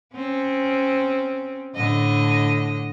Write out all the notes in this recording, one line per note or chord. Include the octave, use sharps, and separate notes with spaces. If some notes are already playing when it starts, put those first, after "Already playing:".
C4 C#4
A2 D3 D#5